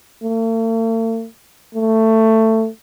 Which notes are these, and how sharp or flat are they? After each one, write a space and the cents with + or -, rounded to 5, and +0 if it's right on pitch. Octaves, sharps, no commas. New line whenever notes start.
A3 +45
A3 +15